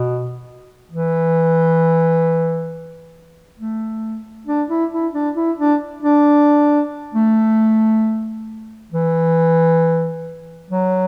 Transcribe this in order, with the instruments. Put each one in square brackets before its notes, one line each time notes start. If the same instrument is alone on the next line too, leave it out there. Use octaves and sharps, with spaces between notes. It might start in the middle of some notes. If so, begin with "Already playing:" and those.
Already playing: [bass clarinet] B2
E3
A3
D4
E4
E4
D4
E4
D4
D4
A3
E3
F#3